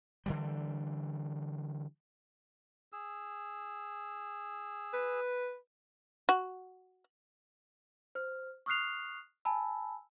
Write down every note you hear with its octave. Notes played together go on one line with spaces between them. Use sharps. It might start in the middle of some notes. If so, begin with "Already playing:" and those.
D3 E3 G3
G#4 E6
B4
F#4
C5 F6
C#6 D#6 F6 F#6 C7 F7
G#5 A5 B5 E6